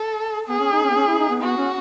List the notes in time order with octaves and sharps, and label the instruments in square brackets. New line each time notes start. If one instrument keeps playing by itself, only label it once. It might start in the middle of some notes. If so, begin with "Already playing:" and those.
Already playing: [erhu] A4
[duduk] B3 [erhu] G#4
[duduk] C#4
D#4
C#4
B3
C#4
E4
D#4
B3
[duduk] B3 [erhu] F#4
[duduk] C#4